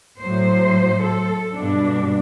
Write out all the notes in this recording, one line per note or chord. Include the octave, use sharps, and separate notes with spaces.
A2 F#3 C5
A4
G2 B2 D4